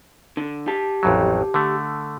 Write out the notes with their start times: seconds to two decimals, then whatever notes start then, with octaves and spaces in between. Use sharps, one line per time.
0.37 D3
0.68 G4 A5
1.03 A1 F2 F#3
1.54 D3 A3